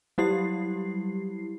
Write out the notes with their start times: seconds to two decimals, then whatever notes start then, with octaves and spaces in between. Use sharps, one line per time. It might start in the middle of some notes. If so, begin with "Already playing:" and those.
0.18 F#3 G3 E4 G4 C7